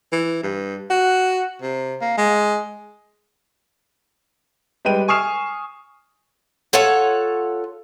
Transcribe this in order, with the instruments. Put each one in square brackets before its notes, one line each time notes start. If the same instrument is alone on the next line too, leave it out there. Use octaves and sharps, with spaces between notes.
[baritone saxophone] E3
G2
F#4
C3
A#3
G#3
[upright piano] G3 G#3 B4 G5 D#7
G#5 C#6 D#6 F6 C7 E7
[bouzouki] F4 A4 C#5 F#5